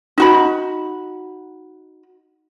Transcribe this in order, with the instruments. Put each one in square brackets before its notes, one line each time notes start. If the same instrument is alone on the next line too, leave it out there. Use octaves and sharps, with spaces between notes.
[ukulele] D#4 F#4 B5